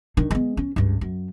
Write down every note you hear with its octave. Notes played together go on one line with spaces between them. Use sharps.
D#3 D4
G#3 B3
C#4
C#2 G2
F#2